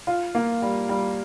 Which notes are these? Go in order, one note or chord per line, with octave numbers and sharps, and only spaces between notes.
F4
A#3
G3
G3